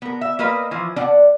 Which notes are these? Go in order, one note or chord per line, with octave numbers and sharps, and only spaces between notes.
B3 A#4
E5
A#3 A#4 B4 D#5
E3 F3
D4 D5 F#5